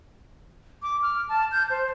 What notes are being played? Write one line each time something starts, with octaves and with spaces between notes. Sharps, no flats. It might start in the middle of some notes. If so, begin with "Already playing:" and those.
D6
F6
A5
G6
C5